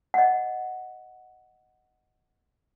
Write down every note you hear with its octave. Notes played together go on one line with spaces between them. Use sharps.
D#5 F#5